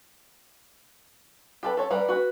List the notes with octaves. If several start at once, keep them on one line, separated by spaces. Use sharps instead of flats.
G4 A4 B4
A4 C#5
G3 A#4 B4
F#4 B4